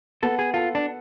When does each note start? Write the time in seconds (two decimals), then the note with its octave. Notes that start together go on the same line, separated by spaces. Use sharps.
0.22 B3 A4
0.39 G#4
0.54 F4 A4
0.75 D4